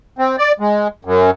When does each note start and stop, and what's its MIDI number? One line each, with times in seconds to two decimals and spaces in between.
0.18 0.36 60
0.38 0.52 74
0.60 0.88 56
1.05 1.30 42